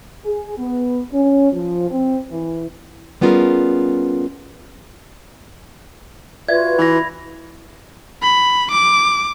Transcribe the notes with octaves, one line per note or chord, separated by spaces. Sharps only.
G#4
B3
C#4
F3
C4
E3
G3 B3 C#4 F4 G#4 A#4
F4 F#4 B4 D5 E5 G#6
E3 B5 A#6
B5
D6